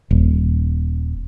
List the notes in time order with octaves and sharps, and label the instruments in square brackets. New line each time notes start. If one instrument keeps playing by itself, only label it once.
[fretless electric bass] D#1